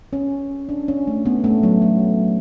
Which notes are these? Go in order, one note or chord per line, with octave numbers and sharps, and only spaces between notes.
C#4
D4
C#4
A3
B3
A3
F#3
F#3